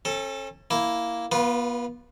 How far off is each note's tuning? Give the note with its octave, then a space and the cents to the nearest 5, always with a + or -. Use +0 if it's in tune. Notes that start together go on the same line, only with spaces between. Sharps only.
C#4 -40 A4 +0
A#3 +0 E4 +0
B3 -40 F4 +0 B4 +0